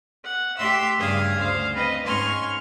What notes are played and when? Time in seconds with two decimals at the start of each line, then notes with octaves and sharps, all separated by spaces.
0.24 F#5
0.57 A3 G4 E5 C6 E6
0.98 G2 C#3 G#4 F5 G#5 D#6
1.38 D2 C5 F5
1.73 C4 B4 D#5
2.05 G#2 C#4 G#5 C6 C#6 F6